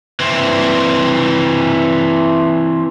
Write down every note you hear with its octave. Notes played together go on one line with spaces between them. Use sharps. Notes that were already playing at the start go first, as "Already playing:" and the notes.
E3 C4